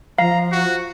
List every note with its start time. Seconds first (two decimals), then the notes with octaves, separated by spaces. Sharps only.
0.18 F3 F5 A#5
0.52 F#4